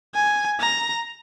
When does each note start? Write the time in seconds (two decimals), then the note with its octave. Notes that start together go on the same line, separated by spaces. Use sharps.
0.15 G#5
0.60 A#5